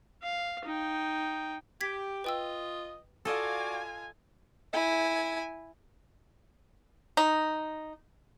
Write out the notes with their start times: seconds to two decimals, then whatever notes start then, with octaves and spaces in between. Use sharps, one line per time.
0.22 F5
0.64 D#4 G5
1.81 G4 G#6 B6
2.24 F4 B4 D#5 G5 E6
3.25 F4 F#4 A4 D5 D#5 F5 G#5
4.73 E4 G#5
7.17 D#4